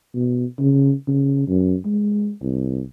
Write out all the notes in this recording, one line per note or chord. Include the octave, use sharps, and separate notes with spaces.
B2
C#3
C#3
F#2
G#3
C2